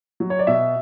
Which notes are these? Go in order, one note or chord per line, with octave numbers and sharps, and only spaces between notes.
F#3
C#5
D5
B2 E5